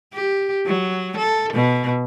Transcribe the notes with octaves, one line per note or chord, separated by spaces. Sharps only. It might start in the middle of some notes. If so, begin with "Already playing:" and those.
G4
F#3
A4
B2